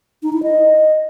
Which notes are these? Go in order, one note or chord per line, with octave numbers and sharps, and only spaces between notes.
D#4
E4
D#5